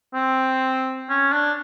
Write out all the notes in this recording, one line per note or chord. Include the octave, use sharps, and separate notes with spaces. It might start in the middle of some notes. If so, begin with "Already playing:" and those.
C4
C#4
D4